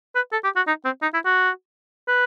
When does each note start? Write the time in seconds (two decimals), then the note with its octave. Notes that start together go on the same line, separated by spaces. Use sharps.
0.15 B4
0.32 A4
0.44 G4
0.56 F#4
0.67 D#4
0.85 C4
1.02 D#4
1.14 E4
1.26 F#4
2.08 B4